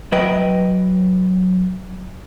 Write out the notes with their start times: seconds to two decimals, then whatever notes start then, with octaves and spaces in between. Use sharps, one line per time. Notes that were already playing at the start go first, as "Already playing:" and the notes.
0.12 F#3 B4 D#5 G5